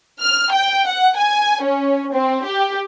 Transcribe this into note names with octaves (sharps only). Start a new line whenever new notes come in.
F6
G5
F#5
G#5
C#4
C4
G4